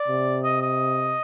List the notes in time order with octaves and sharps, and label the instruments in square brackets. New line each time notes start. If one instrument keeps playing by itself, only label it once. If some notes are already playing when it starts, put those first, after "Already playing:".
Already playing: [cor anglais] D5
[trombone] C3
[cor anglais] D#5
D#5